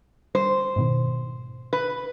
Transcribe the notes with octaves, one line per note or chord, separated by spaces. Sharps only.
G3 C5
G#2 B2 D#3
B4